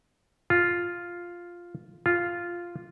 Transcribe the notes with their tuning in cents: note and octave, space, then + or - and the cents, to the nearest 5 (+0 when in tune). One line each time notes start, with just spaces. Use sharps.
F4 +0
F4 -5